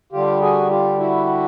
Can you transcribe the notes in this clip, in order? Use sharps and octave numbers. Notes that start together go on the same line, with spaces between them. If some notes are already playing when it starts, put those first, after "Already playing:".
D3 G3 F4 G4
F#4 G#4
F4 G4
E4 F#4